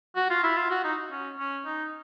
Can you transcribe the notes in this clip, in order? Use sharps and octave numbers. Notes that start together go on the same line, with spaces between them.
F#4
F4
E4
F4
F#4
D#4
C#4
C#4
D#4